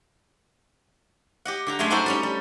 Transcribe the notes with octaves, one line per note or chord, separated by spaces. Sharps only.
G4 D#5 F#5
D3 G4 A#5
F#2 G#3 A3 G#5 C6
G3 D4 D#4 F#4 A4 C5
G3 C#4 D#4
G3